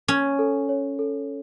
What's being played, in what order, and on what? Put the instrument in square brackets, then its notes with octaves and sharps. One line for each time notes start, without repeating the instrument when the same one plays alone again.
[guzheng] C#4 [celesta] G#5
[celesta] A4
C#5
A4